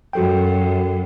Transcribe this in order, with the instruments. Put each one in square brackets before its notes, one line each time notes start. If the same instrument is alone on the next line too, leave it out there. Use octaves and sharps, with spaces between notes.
[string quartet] F#2 [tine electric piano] F#4 A4 G5